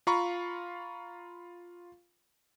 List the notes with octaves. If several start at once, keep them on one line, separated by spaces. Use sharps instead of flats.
F4 F5 A#5 B5 C#6